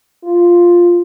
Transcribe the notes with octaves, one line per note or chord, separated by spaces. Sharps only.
F4